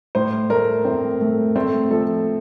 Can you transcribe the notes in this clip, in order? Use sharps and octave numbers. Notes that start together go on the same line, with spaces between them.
A2 C5
A3 A#4
A2 C4
A3
A3 C4
F3 A4